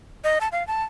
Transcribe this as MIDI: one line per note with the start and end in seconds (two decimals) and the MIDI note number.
0.24 0.39 75
0.41 0.48 81
0.52 0.66 77
0.67 0.84 81